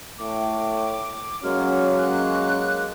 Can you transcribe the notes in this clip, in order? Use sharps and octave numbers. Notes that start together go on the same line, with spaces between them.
A2 D6
F#3 G#3 A#3 C#4 F6
F#6